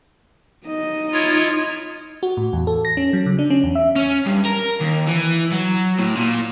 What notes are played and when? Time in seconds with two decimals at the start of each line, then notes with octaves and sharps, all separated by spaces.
0.66 D#4 D#5
1.12 E4 F4 C#5
2.23 F#4
2.37 A2
2.53 E2
2.67 A4
2.85 A#6
2.97 C#4
3.13 F#3
3.26 C#3
3.39 D4
3.50 C#4
3.64 E2
3.75 E5
3.96 C#4
4.26 G2
4.46 A#4
4.81 D#2
5.08 E3
5.52 F#3
5.99 A2
6.16 A#2